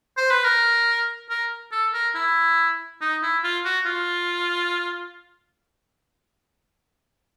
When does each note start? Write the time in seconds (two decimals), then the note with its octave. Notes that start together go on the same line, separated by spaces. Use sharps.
0.17 C5
0.30 B4
0.44 A#4
1.30 A#4
1.72 A4
1.94 A#4
2.15 E4
3.01 D#4
3.22 E4
3.44 F4
3.65 F#4
3.86 F4